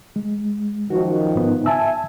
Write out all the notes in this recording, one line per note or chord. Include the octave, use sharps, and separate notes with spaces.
G#3
F#2 D#3 F3 F#4
G#2 B3 D#4
E5 G#5 A5 E6